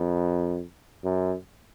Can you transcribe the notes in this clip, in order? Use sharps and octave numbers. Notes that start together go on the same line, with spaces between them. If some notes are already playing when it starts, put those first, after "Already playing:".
Already playing: F2
F#2